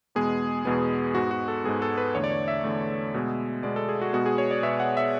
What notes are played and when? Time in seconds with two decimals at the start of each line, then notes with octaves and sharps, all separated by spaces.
0.15 E2 B2 G#3 B3 G#4
0.65 E2 B2 G#3 B3
1.15 G#2 G#3 B3 F#4
1.31 F#4
1.48 A4
1.64 G#2 G#3 B3 G#4
1.82 A4
1.98 B4
2.14 E2 D3 A3 C#5
2.24 D5
2.32 C#5
2.48 E5
2.64 E2 D3 A3
3.14 B2 G#3 B3
3.63 B2 G#3 B3 D5
3.76 A4
3.89 G#4
4.01 F#4
4.13 B2 G#3 B3 F#4
4.26 G#4
4.38 C#5
4.51 D5
4.63 B2 G#3 B3 E5
4.80 F#5
4.97 E5